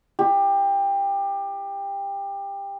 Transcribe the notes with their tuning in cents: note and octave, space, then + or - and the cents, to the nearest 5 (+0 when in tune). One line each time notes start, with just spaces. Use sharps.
G4 +20